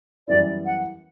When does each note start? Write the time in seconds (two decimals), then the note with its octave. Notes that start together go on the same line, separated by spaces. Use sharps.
0.28 F#2 E3 G3 B3 E4 D5
0.65 F#5